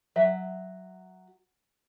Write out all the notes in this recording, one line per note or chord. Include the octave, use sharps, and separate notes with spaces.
F#3 E5